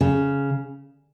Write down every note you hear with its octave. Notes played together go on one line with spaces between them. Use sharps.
C#3